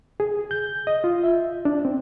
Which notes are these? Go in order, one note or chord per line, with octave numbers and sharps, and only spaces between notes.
G#4
G6
D#5
F4
E5
D4
C4